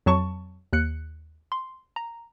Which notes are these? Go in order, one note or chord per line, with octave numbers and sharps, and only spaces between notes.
F2 F#3 A5 C#6
D#2 F#6 C#7
C6
A#5